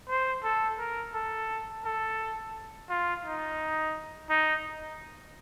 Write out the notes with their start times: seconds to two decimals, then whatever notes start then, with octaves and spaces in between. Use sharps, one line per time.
0.09 C5
0.43 A4
0.78 A#4
1.14 A4
1.85 A4
2.89 F4
3.25 D#4
4.30 D#4